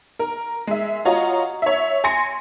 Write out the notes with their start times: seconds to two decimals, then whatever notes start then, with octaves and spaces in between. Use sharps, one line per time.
0.19 A#4
0.67 G#3 E5
1.05 F4 F#4 C#5 D#5 A#5
1.62 C#5 E5
2.04 G#5 C6 A#6 C#7